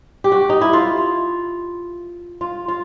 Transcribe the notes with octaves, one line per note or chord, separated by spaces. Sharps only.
G4
F#4
D#4
E4
F4
F4
F4